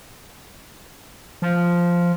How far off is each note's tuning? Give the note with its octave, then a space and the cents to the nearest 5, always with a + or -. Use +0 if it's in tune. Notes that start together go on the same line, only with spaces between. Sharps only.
F3 -5